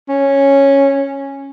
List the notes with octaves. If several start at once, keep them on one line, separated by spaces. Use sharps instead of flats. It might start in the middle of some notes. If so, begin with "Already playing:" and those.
C#4